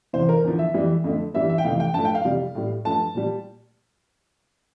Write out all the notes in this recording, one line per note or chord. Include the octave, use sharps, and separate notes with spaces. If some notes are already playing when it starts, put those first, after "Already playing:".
E2 C3 E3 C5
A#4
E2 D3 F3
E5
F2 E3 G3
F2 D3 A3
G2 E3 G3 E5
E5
G5
F2 C3 E3 A3 F5
G5
G2 F3 A3 A5
G5
F5
F2 C3 G3
A2 G3
G2 F3 A3 A5
A#2 G3